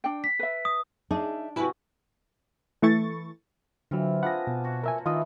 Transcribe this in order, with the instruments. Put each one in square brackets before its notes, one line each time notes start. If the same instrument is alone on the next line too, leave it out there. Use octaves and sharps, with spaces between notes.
[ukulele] D4 G5
[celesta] B6
[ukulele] B4 E5
[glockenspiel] D#6
[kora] D4 [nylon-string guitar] D#4 [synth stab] G#4 [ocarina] E5
[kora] C3 F#4 [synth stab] E4 B4 [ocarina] G#5
[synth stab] E3 A3 E4 C#6 A6
[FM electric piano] D3 F#3 [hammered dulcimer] E3 C4 F4
[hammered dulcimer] D4 G#4 [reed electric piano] F4 F#5 [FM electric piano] B5 A#6
[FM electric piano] B2 [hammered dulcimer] A5
[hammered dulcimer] F#4 C#5
[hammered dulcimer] A#2 [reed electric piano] A#4 E5 G#5
[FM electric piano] D#3 [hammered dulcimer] E3 A3 B4 [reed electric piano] F4 D#5 D#6